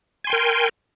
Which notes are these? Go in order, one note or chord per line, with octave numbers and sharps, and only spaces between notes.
A#4 G5 G#5 C6